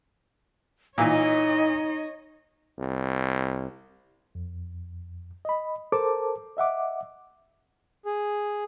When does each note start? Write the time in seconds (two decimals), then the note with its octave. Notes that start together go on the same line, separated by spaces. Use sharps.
0.98 A#2 E3 D#4 C#5 D#5
2.79 C2
4.35 F2
5.45 D#5 B5
5.92 A4 A#4 C5 A5 D6
6.57 D#5 E5 F#5 D6
8.05 G#4